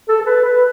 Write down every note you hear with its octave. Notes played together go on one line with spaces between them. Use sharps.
A4
A4
B4
B4